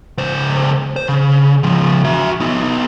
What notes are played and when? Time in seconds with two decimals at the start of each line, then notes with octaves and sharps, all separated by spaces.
0.18 C#2 C5
0.96 C5
1.09 C#3
1.63 C#2 F3
2.04 F#4 E5
2.40 B3 D#4